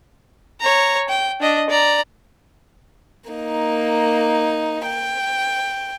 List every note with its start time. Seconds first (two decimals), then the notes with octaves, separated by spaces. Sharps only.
0.60 C#5 A#5
1.09 G5
1.40 D4 D#5
1.70 D5 A#5
3.30 A#3 D#4
4.87 G5